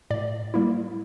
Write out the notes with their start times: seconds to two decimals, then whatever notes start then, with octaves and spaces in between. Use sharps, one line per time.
0.10 A2 D5
0.54 G3 A#3 E4